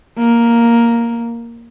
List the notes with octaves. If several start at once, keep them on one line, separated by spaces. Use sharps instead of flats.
A#3